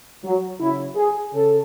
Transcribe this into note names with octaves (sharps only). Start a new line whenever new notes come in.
F#3
C#3 F#3 E4
G#4
C#3 A4